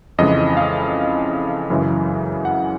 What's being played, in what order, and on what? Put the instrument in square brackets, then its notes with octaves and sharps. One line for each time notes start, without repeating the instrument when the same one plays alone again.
[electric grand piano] F2 C#3 E3 G#3 D#5
F5
F#2 C#3 E3 G#3
F#5